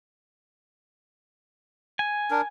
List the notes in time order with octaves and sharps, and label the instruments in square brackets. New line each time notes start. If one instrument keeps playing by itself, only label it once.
[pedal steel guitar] G#5
[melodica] D4 A#4